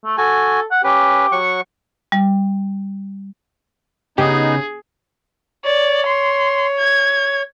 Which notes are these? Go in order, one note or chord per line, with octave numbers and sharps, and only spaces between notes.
A3
F#4 A4 G#5
F#5
C#4 G4 B4
F#3 F#5 C#6
G3
C#3 B3 D#4 G4 G#4
C#5 D5
C6
G#6